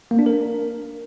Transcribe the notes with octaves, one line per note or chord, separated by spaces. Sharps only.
A#3
D4
A#4